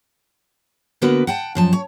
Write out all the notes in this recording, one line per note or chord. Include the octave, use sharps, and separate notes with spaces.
D3 A#3 B3 F#4 A#4 B4
F#5 G5 A5
F#2 F3 A5
C#5